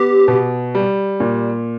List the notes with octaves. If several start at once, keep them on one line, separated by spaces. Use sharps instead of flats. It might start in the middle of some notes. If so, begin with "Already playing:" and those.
Already playing: B3 G4
B2
G3
A#2